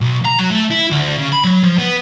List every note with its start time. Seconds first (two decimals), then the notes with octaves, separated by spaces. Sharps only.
0.01 B1
0.25 A#5
0.39 F#3
0.51 A3
0.71 E4
0.91 D2
1.18 C#3
1.32 B5
1.44 F#3
1.63 F3
1.78 B3